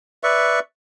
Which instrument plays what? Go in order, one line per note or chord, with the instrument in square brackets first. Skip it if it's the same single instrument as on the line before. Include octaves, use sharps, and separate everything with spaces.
[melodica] B4 D5 E5 C#6